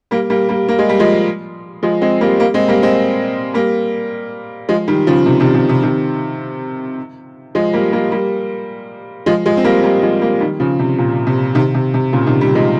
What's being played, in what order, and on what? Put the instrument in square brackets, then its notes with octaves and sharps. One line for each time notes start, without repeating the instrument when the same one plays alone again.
[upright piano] G3 A#3
G3 A#3
G3 A#3
A#3
G#3
G3
F3 G#3
F3 G#3
G#3 C4
G3 A#3
G3 A#3
G#3 C4
G3 A#3
G#3 C4
G3 A#3
F3 G#3
D#3 G3
C#3 F3
C3 D#3
C3 D#3
C3
C3
C3 D#3
F3 G#3
G3 A#3
G3 A#3
G3 A#3
F3 G#3
F3 G#3
C4
G3 A#3
G3 A#3
F3 G#3
G3 A#3
D#3 G3
C#3 F3
C3
A#2
C3
C3 D#3
C3
C3
A#2 C#3
C3 D#3
D#3 G3
F3 G#3